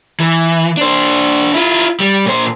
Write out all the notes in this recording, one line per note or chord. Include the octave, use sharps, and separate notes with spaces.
E3
D4 C5
E4 F4
G3
A#2 C5